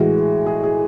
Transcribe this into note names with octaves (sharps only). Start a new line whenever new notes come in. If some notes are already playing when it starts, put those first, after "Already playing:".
Already playing: A2 E3 G#3 F#4
G#4
G#4